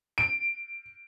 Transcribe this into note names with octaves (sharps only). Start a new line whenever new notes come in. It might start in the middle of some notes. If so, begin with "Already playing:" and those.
D7